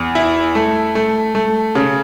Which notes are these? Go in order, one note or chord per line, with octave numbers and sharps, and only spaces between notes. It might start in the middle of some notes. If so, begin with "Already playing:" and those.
Already playing: E2
E4
A3
A3
A3
C#3